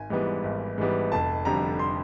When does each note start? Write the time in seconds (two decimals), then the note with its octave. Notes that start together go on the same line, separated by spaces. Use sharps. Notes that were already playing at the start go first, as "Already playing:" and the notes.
Already playing: G#1 G#5
0.10 G#2 E3 G3 B3
0.43 G#1
0.78 G#2 E3 G3 B3
1.12 F1 A5
1.45 F2 D3 G3 A#5
1.79 C6